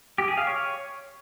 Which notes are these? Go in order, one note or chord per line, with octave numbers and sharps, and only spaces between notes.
G4
G#4
F5
C#5